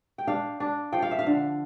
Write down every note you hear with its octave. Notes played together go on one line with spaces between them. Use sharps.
G5
D4 F5
D4
F3 G5
F5
E5
F5
D3